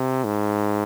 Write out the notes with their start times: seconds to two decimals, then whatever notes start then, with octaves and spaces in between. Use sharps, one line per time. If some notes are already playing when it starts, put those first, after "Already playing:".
Already playing: C3
0.24 G#2